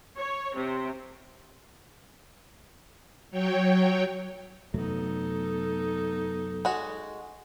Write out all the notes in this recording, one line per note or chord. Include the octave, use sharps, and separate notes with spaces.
C#5
C3
F#3 C#5 G5
F#2 C3 F#3 A3 B3 D#4 A4
G#3 F#4